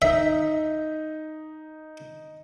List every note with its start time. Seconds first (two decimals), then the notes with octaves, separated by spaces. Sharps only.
0.02 D#4 D#5 E5